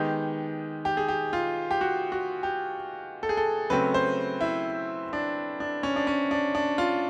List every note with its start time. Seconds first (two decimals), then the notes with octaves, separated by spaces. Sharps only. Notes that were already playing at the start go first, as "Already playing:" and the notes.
Already playing: D#3 G#3 B3 G4
0.85 G4
0.97 G#4
1.08 G4
1.33 F4
1.71 G4
1.81 F#4
2.12 F#4
2.43 G4
3.23 A4
3.29 G#4
3.37 A4
3.70 C#3 F#3 A3 C4 B4
3.94 C5
4.41 E4
5.13 D4
5.60 D4
5.83 C#4
5.96 D4
6.07 C#4
6.31 D4
6.55 D4
6.78 F4